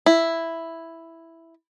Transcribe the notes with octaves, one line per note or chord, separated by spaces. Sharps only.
E4